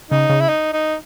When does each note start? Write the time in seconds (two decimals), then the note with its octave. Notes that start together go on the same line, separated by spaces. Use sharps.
0.11 C#3 D#4
0.29 C#3
0.41 E4
0.49 D#4
0.73 D#4